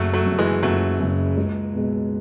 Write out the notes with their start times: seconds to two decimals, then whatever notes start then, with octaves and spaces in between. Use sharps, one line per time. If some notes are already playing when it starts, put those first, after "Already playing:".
Already playing: F#1 F#3 A3
0.13 F#3 A3
0.26 F#2 C#3
0.38 E3 G#3
0.63 F#1 F#3 A3
1.00 F#2 C#3
1.37 C#2
1.74 B2 G#3